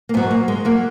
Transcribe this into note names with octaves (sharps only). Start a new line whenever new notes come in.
A#3
G#2 F#3 B3
A#3
G#3
F#3 A#3